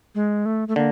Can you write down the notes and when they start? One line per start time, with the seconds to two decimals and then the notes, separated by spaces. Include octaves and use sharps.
0.15 G#3
0.46 A3
0.68 A3
0.76 D3 A#3